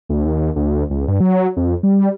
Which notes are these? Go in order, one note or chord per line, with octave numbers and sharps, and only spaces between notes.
D2
D#2
D2
C#2
G2
F#3
F2
G3